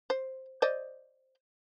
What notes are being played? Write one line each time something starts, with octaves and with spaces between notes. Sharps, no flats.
C5
C5 D5 D#5